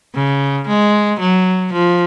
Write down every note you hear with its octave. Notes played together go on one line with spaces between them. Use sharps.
C#3
G#3
F#3
F3